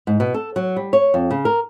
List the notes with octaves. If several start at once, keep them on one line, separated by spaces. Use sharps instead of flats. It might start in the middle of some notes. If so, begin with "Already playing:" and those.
G#2
B2
A4
F#3
G3
C#5
F2
C#3
A#4